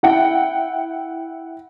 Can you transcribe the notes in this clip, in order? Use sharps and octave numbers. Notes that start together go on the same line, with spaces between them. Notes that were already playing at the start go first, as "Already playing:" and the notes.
E4 F#5 G5